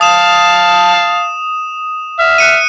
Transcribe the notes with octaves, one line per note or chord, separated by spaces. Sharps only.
F5 A5 D#6 E7
E5 F6
F#6 C#7 D#7